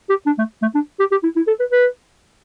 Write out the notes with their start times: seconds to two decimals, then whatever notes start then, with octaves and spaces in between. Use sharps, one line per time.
0.10 G4
0.26 D4
0.38 A3
0.62 A3
0.75 D4
0.99 G4
1.11 G4
1.23 E4
1.36 E4
1.47 A4
1.60 B4
1.72 B4